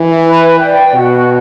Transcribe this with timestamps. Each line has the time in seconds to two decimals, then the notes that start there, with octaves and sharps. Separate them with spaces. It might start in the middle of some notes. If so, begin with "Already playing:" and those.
Already playing: E3
0.25 B4
0.59 D5 G5
0.94 B2 F#4